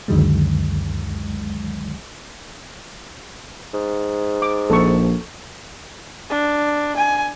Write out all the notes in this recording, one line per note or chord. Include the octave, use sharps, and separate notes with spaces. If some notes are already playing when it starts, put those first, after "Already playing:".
C#2 F#2 D3 D#3 F#3 G#3
G#2
D6
A#1 A4 C#6
D4
G#5